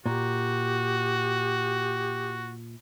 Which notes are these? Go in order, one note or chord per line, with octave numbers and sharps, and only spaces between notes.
A#2 F#4 G4